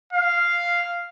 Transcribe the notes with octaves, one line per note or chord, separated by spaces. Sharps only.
F5